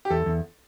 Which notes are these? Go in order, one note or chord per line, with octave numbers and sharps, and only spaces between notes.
G4
E2 A4
E2